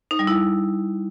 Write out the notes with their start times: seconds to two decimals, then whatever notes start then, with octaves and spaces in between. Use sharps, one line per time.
0.11 D#4
0.19 G3
0.27 E4